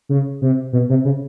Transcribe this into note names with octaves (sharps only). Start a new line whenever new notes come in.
C#3
C3
B2
C3
C#3